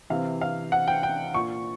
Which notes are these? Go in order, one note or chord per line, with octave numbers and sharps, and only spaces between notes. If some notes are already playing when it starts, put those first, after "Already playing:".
C3 E3 F5
F5
F#5
G5
G5
A#2 C#6